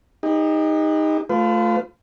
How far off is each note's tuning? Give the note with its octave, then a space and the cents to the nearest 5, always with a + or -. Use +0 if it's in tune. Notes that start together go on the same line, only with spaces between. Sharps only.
D#4 +5 G4 +40
A3 +0 F4 +0 B4 +45